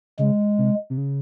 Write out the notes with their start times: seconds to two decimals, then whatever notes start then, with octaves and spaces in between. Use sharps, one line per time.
0.19 C#3 G#3
0.58 C3
0.90 C3
0.98 C#3